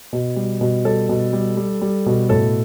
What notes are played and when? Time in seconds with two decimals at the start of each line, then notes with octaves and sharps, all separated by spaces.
0.13 B2
0.36 G3
0.61 B2
0.85 G3 A4
1.09 B2
1.33 G3
1.57 G3
1.81 G3
2.06 B2
2.29 A2 A4